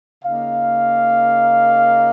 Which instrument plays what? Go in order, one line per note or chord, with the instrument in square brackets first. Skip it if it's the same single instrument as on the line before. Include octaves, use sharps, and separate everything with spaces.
[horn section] C#3 A#3 D#4 F5